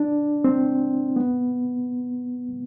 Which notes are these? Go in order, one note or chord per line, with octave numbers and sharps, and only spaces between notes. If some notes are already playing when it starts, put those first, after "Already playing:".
Already playing: D4
C4
B3